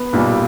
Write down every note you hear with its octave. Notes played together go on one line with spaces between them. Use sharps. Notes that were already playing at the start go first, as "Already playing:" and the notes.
Already playing: B3
B1 A#2 G3